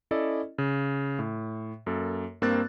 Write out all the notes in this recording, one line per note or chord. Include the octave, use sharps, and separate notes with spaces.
C#4 E4 A4 D5 D#5
C#3
A2
F#2 A#3 A4
G2 A#3 C4 A#4 F#6 A6